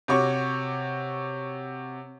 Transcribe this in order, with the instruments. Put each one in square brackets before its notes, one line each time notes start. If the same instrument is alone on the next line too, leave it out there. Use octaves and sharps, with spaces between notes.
[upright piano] C3 F#4 C#5 C#6 D6